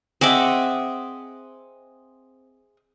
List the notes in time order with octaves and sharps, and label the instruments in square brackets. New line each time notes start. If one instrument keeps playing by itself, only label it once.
[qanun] C4 F#5 D6 [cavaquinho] G#4 D#5 E5